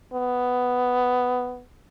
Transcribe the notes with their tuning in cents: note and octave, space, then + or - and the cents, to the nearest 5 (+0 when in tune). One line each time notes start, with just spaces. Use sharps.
B3 +10